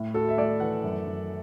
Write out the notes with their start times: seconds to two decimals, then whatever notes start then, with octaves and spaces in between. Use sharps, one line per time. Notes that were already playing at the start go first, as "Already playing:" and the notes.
Already playing: A2
0.14 F#4 A4
0.29 E5
0.38 A3 D5
0.60 E3 F#5
0.84 F#2
1.06 F#2